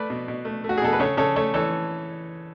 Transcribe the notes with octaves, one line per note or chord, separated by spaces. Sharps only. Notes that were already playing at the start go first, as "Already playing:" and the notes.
Already playing: A3 B4 D5
B2
B2
A3
A3
F#4
G#4
B2 A4
B4
C#3 A4 C#5
C#3 A4 C#5
A3 A4 C#5
E3 A4 C#5